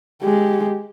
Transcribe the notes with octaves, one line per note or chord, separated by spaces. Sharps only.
G#3 G4